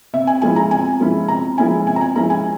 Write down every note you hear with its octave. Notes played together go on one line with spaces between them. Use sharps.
C3 E5
G#5
F3 G#3 C#4 E4 G#5
A#5
C3 G#5
F3 G#3 C#4 E4
C3 A#5
F3 G#3 C#4 E4 G#5
C3 G#5
A#5
G#5
F3 G#3 C#4 E4 A#5
G#5